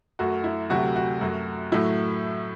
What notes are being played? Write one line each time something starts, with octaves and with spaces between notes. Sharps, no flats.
F#2 F#3 A3 F#4
E4
D2 C3 F#3 A3 F#4
F#4
F#2 F#3 A3
A2 F#3 A3 E4